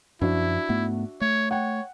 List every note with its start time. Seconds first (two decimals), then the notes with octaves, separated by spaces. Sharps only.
0.21 F#2 F3 D4 E4 F#4 E5
0.69 G#2 A3 B3
1.21 A3 C#5
1.51 C#5 F#5 G5